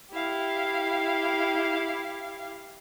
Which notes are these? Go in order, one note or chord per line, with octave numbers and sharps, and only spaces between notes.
E4 G4 F5